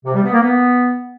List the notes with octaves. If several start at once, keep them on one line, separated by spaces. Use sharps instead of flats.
C3
G3
B3
A#3
B3